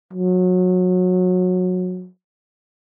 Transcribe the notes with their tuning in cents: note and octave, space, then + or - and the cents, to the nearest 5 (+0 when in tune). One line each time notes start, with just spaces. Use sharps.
F#3 -20